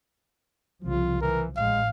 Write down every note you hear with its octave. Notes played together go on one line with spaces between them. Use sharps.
C2 C#3 F3 F4
E3 F3 A#4
A1 G#3 F5